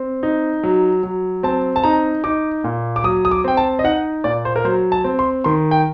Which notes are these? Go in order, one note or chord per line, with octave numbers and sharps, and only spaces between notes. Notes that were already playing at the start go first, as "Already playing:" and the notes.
Already playing: C4
D#4
F#3
F#3
C4 A5
A5
D#4 A#5
D#4 D6
A#2
D6
F#3 D#6
D#6
D6
C4 G5
A5
D#5
D#4 F#5
A#2 D5
C5
A#4
F#3 C5
A5
C4
C6
D#3 C6
G5